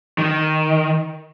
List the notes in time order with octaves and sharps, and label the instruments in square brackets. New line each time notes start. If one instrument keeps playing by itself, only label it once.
[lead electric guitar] D#3